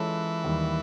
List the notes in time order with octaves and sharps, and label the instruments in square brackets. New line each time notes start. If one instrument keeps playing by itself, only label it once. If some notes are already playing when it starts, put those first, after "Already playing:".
Already playing: [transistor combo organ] E3 [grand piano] G#3 C#4 F4 A4 C#5
[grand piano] D#2 D#3 G3